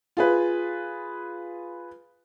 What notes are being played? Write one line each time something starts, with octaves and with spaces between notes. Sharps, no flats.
F4 G#4 B4